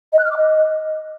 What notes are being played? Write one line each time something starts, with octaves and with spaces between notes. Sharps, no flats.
D#5
F#6
F6
D6
D#5